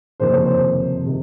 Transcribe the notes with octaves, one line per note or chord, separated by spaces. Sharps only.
F#1 F2 C3 D#3 A#3 C5
C#5
C5
C3 D#3